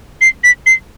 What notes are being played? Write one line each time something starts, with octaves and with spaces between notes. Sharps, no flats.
C7
B6
C7